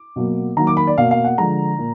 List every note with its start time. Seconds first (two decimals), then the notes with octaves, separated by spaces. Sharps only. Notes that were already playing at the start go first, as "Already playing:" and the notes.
Already playing: D6
0.16 B2 F#3 A#3
0.57 D#3 F#3 A#3 A#5
0.67 D6
0.77 B5
0.87 D5
0.98 B2 A#3 F5
1.11 F5
1.24 F#5
1.38 D3 F3 G#3 A#5
1.78 A#2